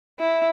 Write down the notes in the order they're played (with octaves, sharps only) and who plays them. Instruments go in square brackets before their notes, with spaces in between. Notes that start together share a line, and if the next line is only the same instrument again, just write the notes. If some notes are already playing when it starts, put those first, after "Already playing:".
[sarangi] E4